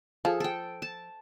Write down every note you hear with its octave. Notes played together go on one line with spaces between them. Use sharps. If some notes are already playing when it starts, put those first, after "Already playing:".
F3 G#4 A4
A4 G5
A5